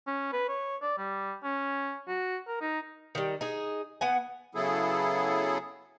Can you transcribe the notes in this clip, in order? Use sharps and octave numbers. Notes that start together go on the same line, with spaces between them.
C#4
B4
C#5
D5
G3
C#4
F#4
A#4
D#4
D#3 G3
D#4 G#4
B3 F#5 G#5
C#3 F#3 B3 E4 G#4 A4